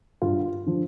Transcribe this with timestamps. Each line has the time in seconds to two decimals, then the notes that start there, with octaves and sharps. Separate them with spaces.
0.22 G2 F4
0.66 D3 F3